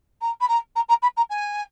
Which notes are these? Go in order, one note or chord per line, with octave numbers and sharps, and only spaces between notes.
A#5
B5
A#5
A#5
A#5
B5
A#5
G#5